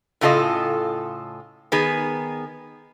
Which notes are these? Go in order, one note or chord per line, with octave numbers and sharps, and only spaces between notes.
A2 C#3 F4 A4 D#5
D#3 B3 G#4